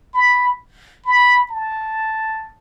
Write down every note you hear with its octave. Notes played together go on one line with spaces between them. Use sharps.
B5
B5
A5